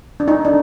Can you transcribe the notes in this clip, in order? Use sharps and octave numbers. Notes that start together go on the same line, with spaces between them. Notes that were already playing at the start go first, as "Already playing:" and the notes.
D4
D#4
D4